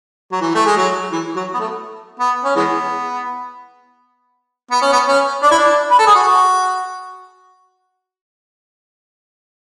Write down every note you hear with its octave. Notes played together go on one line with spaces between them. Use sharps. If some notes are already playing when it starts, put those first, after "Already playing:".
F#3
E3
A3
G#3
F#3
E3
F#3
B3
A3
B3
C#4
E3 G#3 B3
B3
C#4
B3
C#4
D4
E4
D4
B4
A4
G#4
F#4